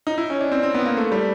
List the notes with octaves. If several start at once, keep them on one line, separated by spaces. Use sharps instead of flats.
D#4
E4
C#4
D4
C4
C4
B3
A#3
A3
G3